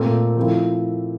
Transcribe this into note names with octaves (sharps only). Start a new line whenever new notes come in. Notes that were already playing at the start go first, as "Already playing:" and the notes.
Already playing: A#2 A3 C4
F3 A3 C4 E4